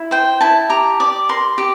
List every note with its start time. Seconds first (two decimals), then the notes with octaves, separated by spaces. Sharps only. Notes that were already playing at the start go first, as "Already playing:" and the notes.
Already playing: E4
0.11 C5 G5
0.41 E4 A5
0.69 G4 A#5
1.00 D5 D6
1.29 A#4 C6
1.58 G4